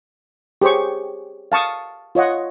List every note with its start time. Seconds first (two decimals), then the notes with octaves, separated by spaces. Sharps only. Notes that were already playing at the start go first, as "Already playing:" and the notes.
0.62 G4 G#4 C5 C#5 C#6
1.52 F5 A5 C#6 D#6
2.15 F4 C#5 D#5 F#5